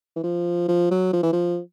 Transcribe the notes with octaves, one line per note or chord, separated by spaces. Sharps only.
E3
F3
F3
F#3
F3
E3
F3